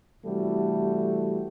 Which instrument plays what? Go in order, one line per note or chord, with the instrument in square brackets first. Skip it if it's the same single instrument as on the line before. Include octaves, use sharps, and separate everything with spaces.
[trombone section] C3 E3 G3 A3 F#4 A4